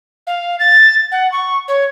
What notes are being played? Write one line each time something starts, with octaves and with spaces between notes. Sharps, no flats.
F5
A6
F#5
C#6
C#5